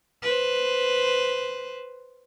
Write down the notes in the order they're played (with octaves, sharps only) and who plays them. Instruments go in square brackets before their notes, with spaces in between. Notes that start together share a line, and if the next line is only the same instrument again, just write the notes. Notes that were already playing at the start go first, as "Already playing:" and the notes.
[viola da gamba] B4 C5